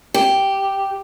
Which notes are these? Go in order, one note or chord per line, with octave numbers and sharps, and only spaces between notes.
G4